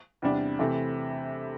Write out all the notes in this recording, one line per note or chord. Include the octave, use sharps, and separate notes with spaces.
E2 C3 G3 D4
C3 E3 A3 C4